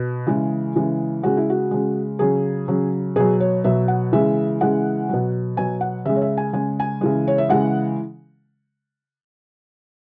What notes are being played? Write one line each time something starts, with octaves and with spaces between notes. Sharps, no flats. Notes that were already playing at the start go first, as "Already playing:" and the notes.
Already playing: B2
C#3 E3 G#3
C#3 E3 G#3
C#3 G#3 F#4
E4
F#4
C#3 G#3
C#3 F#3 G#4
C#3 F#3
B2 F#3 G#4
C#5
B2 F#3 E5
F#5
C#3 E3 G#3 E5
C#3 E3 G#3 F#5
B2 F#3
B2 F#3 G#5
F#5
C#3 G#3 E5
C#5
E5
G#5
C#3 G#3 G#5
G#5
C#3 E3 G#3
C#5
E5
C#3 E3 G#3 F#5